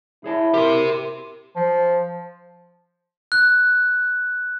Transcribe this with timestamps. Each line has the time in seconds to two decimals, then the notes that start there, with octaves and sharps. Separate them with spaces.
0.24 E4 G#4 C#5 A5
0.54 G4 A#4 C6
1.56 F3
3.32 F#6